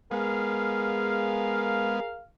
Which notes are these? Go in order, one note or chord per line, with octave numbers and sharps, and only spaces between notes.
G#3 B3 G#4 A#4 F5